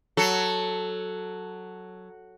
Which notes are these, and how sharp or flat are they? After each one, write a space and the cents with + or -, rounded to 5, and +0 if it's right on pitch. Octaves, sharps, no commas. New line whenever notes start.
F#3 +0 A4 +0